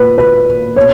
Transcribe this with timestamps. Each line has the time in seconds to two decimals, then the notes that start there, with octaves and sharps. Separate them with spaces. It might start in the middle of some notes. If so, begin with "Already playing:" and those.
Already playing: A#2 B4
0.18 B4
0.76 B2 C#5